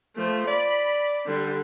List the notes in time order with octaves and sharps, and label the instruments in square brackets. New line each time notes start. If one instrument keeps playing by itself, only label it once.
[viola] F3 A3
[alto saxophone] D5 [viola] B5
[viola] D3 G3